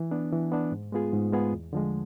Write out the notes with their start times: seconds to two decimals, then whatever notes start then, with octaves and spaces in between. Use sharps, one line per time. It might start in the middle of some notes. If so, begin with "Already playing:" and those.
Already playing: E3
0.11 B3 D4
0.32 E3
0.52 B3 D4
0.72 G#2
0.92 G#3 B3 F4 G#4
1.13 G#2
1.33 G#3 B3 F4 G#4
1.52 E2
1.73 D3 F3 G#3